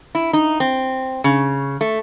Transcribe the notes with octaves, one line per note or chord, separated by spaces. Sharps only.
E4
D#4
C4
C#3
A3